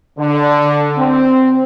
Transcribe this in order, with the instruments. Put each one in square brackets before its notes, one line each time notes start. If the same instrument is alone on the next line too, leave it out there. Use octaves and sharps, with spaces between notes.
[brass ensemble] D3
C4